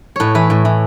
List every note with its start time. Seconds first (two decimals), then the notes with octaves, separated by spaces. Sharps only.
0.16 A2 B4 C#5
0.35 E3 B4
0.50 A2
0.65 E3